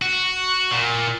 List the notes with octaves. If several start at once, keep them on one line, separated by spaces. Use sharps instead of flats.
F#4
A#2